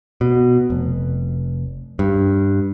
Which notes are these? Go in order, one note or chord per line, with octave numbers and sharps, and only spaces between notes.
B2
F1
G2